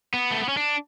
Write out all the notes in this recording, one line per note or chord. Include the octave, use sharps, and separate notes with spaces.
B3
A3
B3
C#4
D4